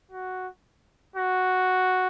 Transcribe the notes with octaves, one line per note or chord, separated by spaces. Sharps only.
F#4
F#4